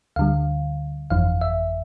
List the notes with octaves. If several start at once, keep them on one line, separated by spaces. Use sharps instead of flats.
D2 D3 G3 F5
G1 F2 E3 F5
E5